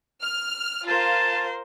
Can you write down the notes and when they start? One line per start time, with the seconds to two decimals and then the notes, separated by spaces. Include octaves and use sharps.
0.21 F6
0.87 F4 A#4 C5 F5 A5